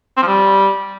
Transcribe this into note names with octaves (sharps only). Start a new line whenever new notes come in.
C4
F3
G3